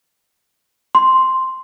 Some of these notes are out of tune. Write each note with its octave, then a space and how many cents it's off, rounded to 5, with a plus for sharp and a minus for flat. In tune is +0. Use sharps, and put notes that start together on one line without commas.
C6 +0